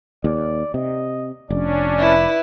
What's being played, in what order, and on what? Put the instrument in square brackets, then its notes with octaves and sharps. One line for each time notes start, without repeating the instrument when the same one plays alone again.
[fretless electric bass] D#2 [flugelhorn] D5
[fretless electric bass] C3 [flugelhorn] D#5
[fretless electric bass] F1 [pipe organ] C#4 D4 [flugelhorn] D5
[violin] E4 B4